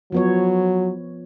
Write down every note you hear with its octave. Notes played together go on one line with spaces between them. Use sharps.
F3 F#3 B3 C#5